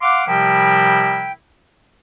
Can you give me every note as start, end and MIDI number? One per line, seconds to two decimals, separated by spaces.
0.01 0.23 77
0.01 0.23 78
0.01 0.23 84
0.01 0.23 86
0.27 1.32 48
0.27 1.32 53
0.27 1.32 55
0.27 1.32 64
0.27 1.32 70
0.27 1.32 79